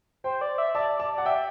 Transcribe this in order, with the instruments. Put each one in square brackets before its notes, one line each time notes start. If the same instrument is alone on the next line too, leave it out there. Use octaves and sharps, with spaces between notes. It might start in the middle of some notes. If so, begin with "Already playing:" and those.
[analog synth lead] C5 [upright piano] G5
[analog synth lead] D5
E5
[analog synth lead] D5 [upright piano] A5
[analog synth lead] D5 [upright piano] A5
[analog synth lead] D5 [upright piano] F#5
[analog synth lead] E5 [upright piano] G5